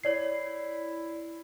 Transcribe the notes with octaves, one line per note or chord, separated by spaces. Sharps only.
E4 C#5 D5 C7